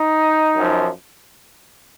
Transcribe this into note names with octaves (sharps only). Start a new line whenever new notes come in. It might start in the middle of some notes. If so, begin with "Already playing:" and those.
Already playing: D#4
F#2 F3